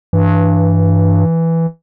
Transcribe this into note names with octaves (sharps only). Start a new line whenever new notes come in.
G2 E3